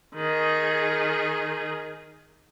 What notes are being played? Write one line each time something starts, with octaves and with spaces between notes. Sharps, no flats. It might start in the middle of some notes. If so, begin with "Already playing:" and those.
D#3 G#4